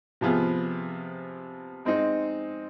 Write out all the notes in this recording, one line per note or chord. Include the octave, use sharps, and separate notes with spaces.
C3 F3 B3 F4 G#4
G#3 C4 D#4